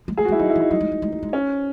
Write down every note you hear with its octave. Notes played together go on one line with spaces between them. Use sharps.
G#3
A3 G#4
F#4
G#3
E4
F#3 D#4
E4
E3
D#4
F#3 D#4
G#3
G#3
G#3
A3
G#3
C#4